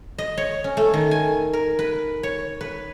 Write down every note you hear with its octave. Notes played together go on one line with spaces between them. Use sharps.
D#5
C#5
C#4
A3
D#3
G#5
A#4
B4
C#5
B4